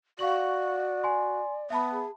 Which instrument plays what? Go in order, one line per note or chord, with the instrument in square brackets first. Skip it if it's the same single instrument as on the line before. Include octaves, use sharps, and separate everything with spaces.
[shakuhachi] F#4 [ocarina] D5 [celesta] F5 C#6 F#7
[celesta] G#5 C6
[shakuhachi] B3 [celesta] E5 A5 B5
[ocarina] G#4